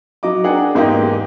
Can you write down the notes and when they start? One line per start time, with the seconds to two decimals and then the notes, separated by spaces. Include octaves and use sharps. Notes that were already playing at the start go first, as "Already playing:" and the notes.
0.23 F#3 D#5 D6
0.44 D4 G#4 A#4 F#5 G5
0.74 E2 G#2 A#3 D#4 G4 D#5